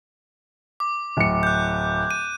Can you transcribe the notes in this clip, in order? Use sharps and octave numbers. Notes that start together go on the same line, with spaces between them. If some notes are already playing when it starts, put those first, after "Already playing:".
D6
D1 C#7
F#6 G6
D#7